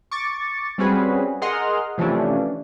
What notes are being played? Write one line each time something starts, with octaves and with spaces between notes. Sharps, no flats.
C#6 D6 A6
G3 C4 C#4 F#4 G#4 B4
G#4 A#4 D#5 F#5 C6 F6
C3 E3 F3 A3 C#4 D4